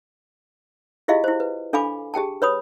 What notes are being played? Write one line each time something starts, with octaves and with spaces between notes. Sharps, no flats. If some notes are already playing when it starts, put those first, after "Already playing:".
E4 F4 G4 G#4 D#5 F5
E4 C5
B4
D4 A4 F5 G#5 B5 D6
G4 G#4 G5 A5
B4 C#5 B5 D#6